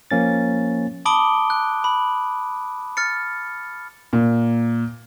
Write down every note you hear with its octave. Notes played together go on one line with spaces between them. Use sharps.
F3 A#3 C#4 A6
A5 B5 D6 D#6 D7 G7
F#6
B5
F6 A6 C#7
A#2